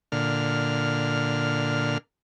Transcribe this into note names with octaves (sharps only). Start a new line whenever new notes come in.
A#2 D3 F6